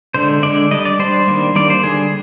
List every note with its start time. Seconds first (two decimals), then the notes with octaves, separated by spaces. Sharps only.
0.14 D3 G#3 D4 C5
0.43 D3 G#3 D4 D5
0.71 G3 D4 D#5
0.85 D5
0.99 G3 D4 C5
1.28 D#3 G3 A#3 D4
1.55 D#3 G3 A#3 D4 D5
1.70 C5
1.83 D3 G3 D4 G#4